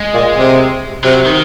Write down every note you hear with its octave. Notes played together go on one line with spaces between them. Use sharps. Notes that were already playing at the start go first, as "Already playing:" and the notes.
Already playing: G#3
A#2
C3
C3 F#3
D#3